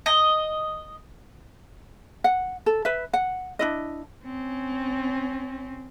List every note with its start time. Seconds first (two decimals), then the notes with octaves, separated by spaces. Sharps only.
0.06 D#5
2.24 F#5
2.66 A4
2.85 B4 E5
3.13 F#5
3.59 D4 E4 D#5
4.24 C4 C#4